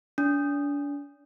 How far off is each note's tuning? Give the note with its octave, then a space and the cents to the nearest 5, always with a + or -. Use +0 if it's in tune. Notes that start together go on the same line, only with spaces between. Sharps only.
D4 -35